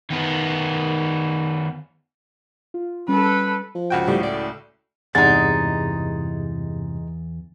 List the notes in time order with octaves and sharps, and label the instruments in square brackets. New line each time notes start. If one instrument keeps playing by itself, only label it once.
[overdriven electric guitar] D#3 B3
[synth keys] F4
[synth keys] G3 C#4 [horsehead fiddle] A4 B4
[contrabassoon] F3
[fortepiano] C#2 F#4 G5
[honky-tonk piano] A2 [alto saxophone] G3
[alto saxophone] D5
[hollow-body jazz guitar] E2 F#5 [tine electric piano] G2 C3 [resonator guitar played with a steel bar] G#3 D#4 [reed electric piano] A6